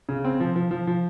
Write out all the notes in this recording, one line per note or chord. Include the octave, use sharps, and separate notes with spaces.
C#3
C4
F3
F3
F3
F3